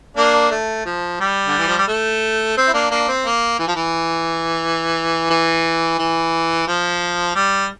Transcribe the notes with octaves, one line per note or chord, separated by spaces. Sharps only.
A#3 D4
A3
F3
G3
D3
E3
F3
G3
A3
C4
E4
A#3 D4
A#3 D4
C4
A#3
E3
F3
E3
E3
E3
F3
G3